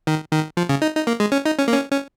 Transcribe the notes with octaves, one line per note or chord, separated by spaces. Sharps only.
D#3
D#3
F3
C#3
D#4
D#4
A#3
G#3
C#4
D#4
C#4
A#3
C#4
C#4